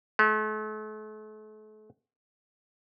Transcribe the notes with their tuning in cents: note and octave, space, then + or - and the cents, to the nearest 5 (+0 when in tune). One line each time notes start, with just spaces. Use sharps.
A3 -40